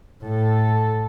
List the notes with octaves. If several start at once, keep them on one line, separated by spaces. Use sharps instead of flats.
A2 A4